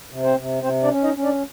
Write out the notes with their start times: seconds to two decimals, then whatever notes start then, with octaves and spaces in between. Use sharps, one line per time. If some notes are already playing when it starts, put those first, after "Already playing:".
0.11 C3
0.23 C4 C5
0.37 C3
0.63 C3 C4 C5
0.83 D4 D5
0.90 C#4
1.04 D#4 D#5
1.17 C#4
1.24 D4 D5